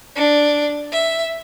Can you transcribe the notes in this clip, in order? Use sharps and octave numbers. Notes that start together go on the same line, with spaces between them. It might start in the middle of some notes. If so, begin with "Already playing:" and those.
D4
E5